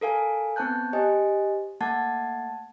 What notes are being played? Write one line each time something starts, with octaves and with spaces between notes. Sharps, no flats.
A4 A#4 F5 G#5
B3 C4 C5 A5 F#6 G6
G4 C5 D#5 G#5
A3 A#3 F#5 A5 G#6 A6